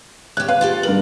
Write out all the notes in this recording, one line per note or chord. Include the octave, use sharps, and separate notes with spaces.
G4 C#5 F#6
B4 F5
F4 G4 A4
G2 A#4 F#7